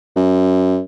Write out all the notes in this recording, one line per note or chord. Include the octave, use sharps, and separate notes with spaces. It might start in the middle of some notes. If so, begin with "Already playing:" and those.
F#2